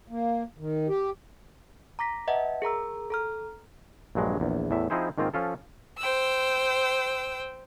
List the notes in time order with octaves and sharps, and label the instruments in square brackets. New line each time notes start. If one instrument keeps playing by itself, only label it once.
[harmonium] A#3
D#3
G4
[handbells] A#5 D6 A#6 B6
B4 D#5 E5 F#5 A5
G#4 A#4 A#5 E6
A4 A#5 F6
[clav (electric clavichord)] A#1 G2 F#3 G#3
A#1 E2
E2 A2 E5
F3 C4 D#4 E4 G#4 C5
G#2 D#3 A#3 C4 F4
F3 C#4 F4 A4
[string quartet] C5 G5 E6